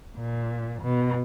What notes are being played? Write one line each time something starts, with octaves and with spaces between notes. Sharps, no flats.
A#2
B2